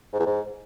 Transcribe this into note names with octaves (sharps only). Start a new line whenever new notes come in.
G#2
E2
G#2